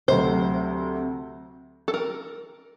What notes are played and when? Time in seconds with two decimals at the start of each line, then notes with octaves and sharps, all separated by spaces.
0.08 D2 C3 F#3 A3 C4 C5
1.88 A4
1.94 A#4